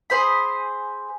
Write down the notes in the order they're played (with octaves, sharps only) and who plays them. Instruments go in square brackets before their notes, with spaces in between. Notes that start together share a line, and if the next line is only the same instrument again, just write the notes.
[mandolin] G#4 C5 B5